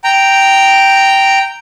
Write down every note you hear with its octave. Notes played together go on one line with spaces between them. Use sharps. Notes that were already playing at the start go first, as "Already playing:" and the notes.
G5 A#5